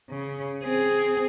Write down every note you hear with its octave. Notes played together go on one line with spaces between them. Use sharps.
C#3
C4 G#4